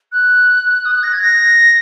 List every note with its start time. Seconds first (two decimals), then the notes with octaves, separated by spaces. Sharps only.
0.12 F#6
0.85 D#6
0.94 F#6
1.03 A#6
1.13 G#6
1.21 A#6